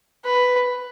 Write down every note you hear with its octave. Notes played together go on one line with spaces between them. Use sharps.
B4